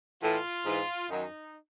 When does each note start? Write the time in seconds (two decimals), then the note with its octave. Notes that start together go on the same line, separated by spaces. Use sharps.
0.21 A2 E3 F4
0.65 G#2 E3
1.09 F#2 D#3 F#3 D#4